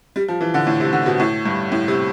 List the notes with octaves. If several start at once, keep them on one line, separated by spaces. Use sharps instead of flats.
G3
F3
E3
D3
A2
C3
D3
B2
A2
G2
A2
C3